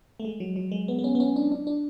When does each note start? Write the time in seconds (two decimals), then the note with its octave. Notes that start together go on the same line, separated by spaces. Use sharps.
0.20 A3
0.25 G#3
0.40 F#3
0.56 F#3
0.72 G#3
0.88 B3
0.99 B3
1.04 C#4
1.15 B3
1.20 C#4
1.36 D4
1.52 D4
1.67 D4